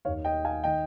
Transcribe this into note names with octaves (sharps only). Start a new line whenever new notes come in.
D#2 D#3 C#5 F5
D#5 G5
F5 G#5
D#3 D#5 G5